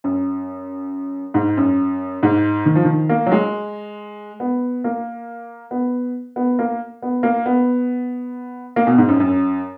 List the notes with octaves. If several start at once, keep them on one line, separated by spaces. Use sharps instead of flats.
F#2
G#2
F#2
G#2
D#3
F3
D#3
A#3
F#3
G#3
B3
A#3
B3
B3
A#3
B3
A#3
B3
A#3
B2
G#2
F#2
F#2